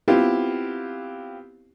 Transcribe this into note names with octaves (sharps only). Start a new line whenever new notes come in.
B3 C4 E4 F4 G4